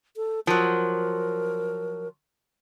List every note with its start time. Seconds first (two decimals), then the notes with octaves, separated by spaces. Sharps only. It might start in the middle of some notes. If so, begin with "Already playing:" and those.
0.17 A4
0.47 F3 F#3 A#4